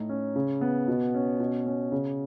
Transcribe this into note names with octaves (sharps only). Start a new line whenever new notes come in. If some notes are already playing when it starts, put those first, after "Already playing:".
Already playing: A2 D#4
C#4
C#3
B3
B2
C#4
B2
C#4
C#3